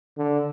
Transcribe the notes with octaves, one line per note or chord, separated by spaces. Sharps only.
D3